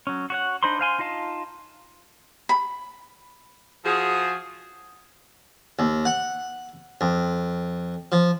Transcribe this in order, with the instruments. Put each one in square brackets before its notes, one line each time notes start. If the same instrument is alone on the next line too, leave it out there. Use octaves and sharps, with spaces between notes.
[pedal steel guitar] F#3 C#4
F#4 C#5 F#5
D4 D#4 C5 B5 C6
C5 F5 G#5 C6
D#4 F4 D#5 F5 A5
[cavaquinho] B5
[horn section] F3 F#4 G#4
[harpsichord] D#2
F#5
F2
F3